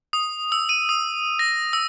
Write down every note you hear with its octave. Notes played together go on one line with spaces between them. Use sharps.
D#6
E6
D#7
D#6
A#6
E6